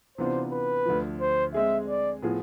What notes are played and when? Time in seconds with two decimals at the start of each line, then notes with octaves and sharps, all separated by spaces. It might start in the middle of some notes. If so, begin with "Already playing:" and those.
0.18 C3 E3 B3 D4 F4 C5
0.51 B4
0.86 D2 D3 F3
1.21 C5
1.54 G#3 C4 G#4 E5
1.88 D5
2.22 A2 F3 B3 F4 G#4